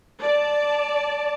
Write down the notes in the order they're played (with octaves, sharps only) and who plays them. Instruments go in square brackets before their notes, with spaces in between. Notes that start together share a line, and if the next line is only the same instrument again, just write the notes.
[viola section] D5 A5